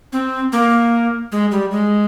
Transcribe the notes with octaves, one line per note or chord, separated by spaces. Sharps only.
C4
A#3
G#3
G3
G#3